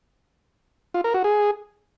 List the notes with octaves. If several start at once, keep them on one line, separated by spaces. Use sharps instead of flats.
F4
A#4
F#4
G#4